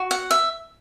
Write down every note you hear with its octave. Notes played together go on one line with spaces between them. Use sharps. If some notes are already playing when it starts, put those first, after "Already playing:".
Already playing: F#4
F#5
E5